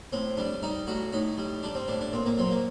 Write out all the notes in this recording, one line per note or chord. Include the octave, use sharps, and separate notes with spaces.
A2 C4
G3 D4
G3 D#4
A2 F#4
A2 D#4
G3
G3 D4
C4
A2 D4
D4
A#2 C4
A#3
F#3 C4
A#3